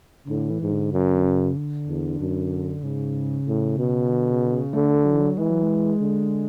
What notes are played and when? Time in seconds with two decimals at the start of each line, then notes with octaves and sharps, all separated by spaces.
0.24 C#3
0.29 A2 D3
0.50 E3
0.61 G#2
0.71 D3
0.93 F#2 C#3
1.14 D3
1.24 C#3
1.56 D3
1.87 E2
2.20 F#2
2.83 G#2 C#3
3.47 A2
3.79 B2
4.10 D3
4.31 C#3
4.46 D3
4.52 C#3
4.73 D3 A3
5.05 F#3
5.13 E3
5.20 F#3
5.38 E3 G#3
5.50 F#3
5.63 G#3
6.00 D3